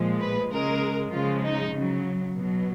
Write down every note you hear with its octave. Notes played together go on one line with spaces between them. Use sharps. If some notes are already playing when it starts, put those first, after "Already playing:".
Already playing: A#2 F3 G#3
B4
C#3 G#3 A#4
C#3 F3 G#3 F4
D#4
C#3 F#3
B2 F#3